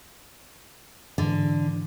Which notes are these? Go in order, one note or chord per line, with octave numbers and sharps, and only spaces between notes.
G#2 D3 E3